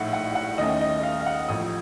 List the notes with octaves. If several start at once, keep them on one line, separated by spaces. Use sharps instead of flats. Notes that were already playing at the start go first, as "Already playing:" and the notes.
Already playing: A#1 A2 A3 D#4 F#5
F#5
F#5
D#2 D#3 A3 C#4 D#5
D#5
F5
F5
F#5
A1 A2 F3 D#6